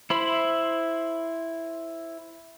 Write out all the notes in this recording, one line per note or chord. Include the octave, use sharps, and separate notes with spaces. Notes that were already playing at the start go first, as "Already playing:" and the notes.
E4 C5 B5